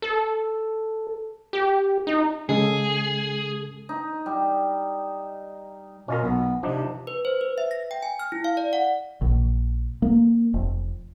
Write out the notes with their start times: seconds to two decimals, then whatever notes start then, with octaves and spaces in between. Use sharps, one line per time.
0.02 A4
1.53 G4
2.07 D#4
2.49 C#3 G#3 G#4 A4
3.89 D#4
4.26 G3
6.08 B2 C#4 F4 A#4
6.23 B1 B3
6.63 C3 F3 D4 D#4
7.07 B4
7.25 C5
7.41 B4
7.58 E5
7.71 A#6
7.91 G5
8.03 G#5
8.19 F6
8.32 E4
8.44 F5
8.57 D5
8.73 F#5
9.21 A#1
10.02 A#3
10.54 F1